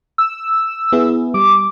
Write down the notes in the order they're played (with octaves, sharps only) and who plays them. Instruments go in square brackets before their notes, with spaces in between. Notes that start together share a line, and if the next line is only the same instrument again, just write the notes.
[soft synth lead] E6
[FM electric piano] B3 E4 G#4
[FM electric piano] G3 [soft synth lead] D6